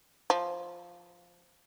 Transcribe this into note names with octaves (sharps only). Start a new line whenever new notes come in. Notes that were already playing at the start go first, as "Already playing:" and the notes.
F3